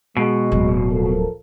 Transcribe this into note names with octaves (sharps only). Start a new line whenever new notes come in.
B2 G#3
D1 F#3
F3 A4 A#4